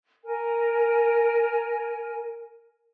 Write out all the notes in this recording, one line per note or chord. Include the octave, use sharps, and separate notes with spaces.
A#4 G#5